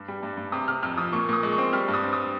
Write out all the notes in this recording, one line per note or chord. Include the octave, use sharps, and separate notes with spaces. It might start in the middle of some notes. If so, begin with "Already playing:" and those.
Already playing: G2
G3
G2
G2
C3 D#6
C3 F6
F2 F6
F3 D#6
A#2 C#6
A#2 D#6
G#3
C#6
C4
G3 F6
G2
D#6
C4
D#6